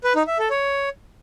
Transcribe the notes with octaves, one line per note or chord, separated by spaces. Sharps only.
B4
D#4
E5
A4
C#5